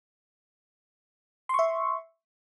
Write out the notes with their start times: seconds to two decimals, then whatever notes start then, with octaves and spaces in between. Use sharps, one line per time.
1.49 C6
1.54 C#6
1.59 E5